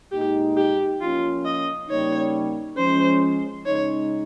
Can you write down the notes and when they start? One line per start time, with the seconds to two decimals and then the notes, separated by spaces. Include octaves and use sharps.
0.12 A#2 G#3 D#4 G4
0.57 G4
1.01 F3 A#3 C#4 F4
1.45 D#5
1.89 C#3 G3 A#3 D#4 C#5
2.77 F3 G#3 C#4 C5
3.66 C#3 G#3 D#4 C#5